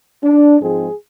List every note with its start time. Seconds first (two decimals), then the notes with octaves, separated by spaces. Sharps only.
0.24 D4
0.60 G#2 F3 G#3 C4 G#4